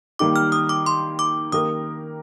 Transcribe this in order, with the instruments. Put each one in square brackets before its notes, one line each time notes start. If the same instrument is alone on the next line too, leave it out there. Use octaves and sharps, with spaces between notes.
[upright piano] D#3 G3 A#3 D#4 G4 [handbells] D6
[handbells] F6
D#6
D6
C6
D6
[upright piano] D#3 A#3 D#4 G4 A#4 [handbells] D#6